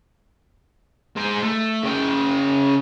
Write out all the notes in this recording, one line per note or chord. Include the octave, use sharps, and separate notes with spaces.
G#3 C5
A3
C#3 G5